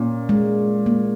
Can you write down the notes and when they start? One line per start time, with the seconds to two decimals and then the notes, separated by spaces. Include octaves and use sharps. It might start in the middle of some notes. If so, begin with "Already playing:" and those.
Already playing: A#2 C#4
0.29 G#3
0.86 A#3